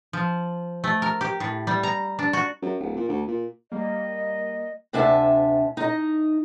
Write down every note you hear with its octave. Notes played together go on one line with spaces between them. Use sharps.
F3
A3
A#4
G4
A2
G3
A#5
D4
F#4
F#2
D1
A#2
D2
A#2
G3 A#3 D#5
D2 C3 D4 E5 G#5 A5
D#4 D#5